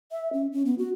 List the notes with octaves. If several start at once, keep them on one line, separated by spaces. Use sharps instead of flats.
E5
C#4
C#4
B3
F#4